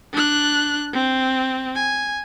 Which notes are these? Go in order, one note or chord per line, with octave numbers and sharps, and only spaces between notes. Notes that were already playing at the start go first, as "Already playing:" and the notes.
D4 F#6
C4
G#5